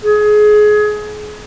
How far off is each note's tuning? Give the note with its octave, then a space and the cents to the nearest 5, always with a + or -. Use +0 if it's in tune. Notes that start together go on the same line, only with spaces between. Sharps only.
G#4 +25